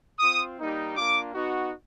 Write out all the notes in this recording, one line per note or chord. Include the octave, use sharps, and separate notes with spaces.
C4 F4 D#6
G3 A#3 D#4 G4
A#3 D4 F4 D6
B3 D#4 F#4